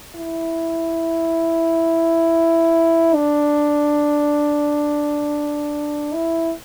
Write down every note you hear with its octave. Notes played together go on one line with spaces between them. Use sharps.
E4
D4
E4